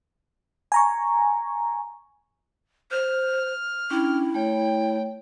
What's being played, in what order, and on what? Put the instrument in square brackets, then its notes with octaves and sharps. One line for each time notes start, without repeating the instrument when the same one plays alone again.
[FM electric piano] G#5 A#5 C#6
[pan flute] C5 [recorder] F6
[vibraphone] C#4 D4 G5 [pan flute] E4
[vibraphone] A3 C#5 [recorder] G5